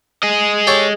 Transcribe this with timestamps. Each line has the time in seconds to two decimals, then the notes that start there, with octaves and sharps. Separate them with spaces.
0.23 G#4 D#5
0.67 G4 A4 C#5